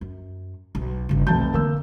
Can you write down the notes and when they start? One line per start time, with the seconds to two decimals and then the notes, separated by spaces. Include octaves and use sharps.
0.01 F#2
0.75 B1
1.09 G1 C#3
1.27 F1 B1 A5 G6
1.54 D3 A#3 E6